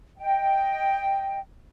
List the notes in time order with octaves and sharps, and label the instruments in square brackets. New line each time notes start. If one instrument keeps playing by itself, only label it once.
[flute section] D#5 G5